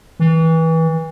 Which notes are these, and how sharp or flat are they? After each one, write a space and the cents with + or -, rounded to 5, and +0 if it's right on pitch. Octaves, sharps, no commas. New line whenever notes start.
E3 -25